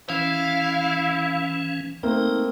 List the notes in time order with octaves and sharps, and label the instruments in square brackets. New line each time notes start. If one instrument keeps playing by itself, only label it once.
[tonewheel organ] E3 C#4 [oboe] E4 [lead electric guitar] F5
[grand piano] A3 A#3 C4 [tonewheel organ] D#4